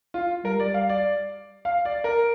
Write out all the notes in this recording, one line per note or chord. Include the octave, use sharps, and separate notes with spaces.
F4
G3 A#4
D5
F5
D5
F5
D5
A#4